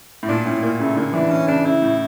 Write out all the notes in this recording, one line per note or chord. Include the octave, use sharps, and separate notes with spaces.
A2
A#2 D4
A2 C#4
A#2 A#3
C#3 A3
D3 A#3
E3 D4
C#4
C#3 D4
C#3 E4
A2